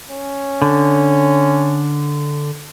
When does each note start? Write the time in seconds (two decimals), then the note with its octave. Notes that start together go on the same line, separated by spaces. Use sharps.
0.10 C#4
0.62 D3